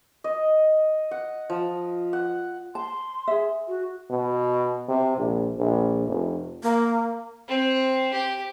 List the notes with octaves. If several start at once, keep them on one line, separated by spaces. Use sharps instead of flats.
D#5
F#5
F3
F#5
A5 C6
G#4 E5
F#4
B2
C3
A#1
A#1
F1
A#3
C4
G4